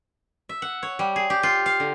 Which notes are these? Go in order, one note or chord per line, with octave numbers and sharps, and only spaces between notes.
E5
F#5
C#5
G3
G#4
G4
F4
F5
D3